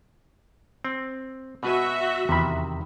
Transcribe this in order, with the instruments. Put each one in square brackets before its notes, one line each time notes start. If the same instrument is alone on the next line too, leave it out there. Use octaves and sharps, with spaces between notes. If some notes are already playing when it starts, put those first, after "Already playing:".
[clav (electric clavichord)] C4
[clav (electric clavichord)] B2 B4 G#5 [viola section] F#4 E5
[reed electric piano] E2 B5 [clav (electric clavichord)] C3 D#3